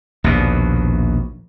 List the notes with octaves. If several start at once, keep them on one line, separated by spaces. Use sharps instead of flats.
A#1 D#2 B2